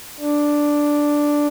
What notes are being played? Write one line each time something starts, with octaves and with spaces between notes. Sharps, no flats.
D4